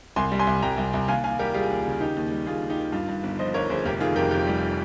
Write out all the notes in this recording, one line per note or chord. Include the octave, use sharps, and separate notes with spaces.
C2 G#5 C6
G3
G#5 C6
C2
C2 G5 A#5
C2
C2
D#2 F5 G#5
D#2 F5 G#5
G3 G4 A#4
G3 F4 G#4
D#2
C#3
D#3 D#4 G4
D#2
G3
D#2 F4 G#4
D#2
D#4 G4
D#3
G2 F4
G2
G1
F3 C5 D#5
G1 A#4 C#5
G1 G#4 C5
F1 G4 A#4
D#3 F4 G#4
F2 G4 A#4
F2 G4 A#4
G3